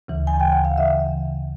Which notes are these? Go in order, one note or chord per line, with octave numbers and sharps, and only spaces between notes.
D2 C#3 E3
G#5
G5
F#5
F5
D2 C#3 E3 E5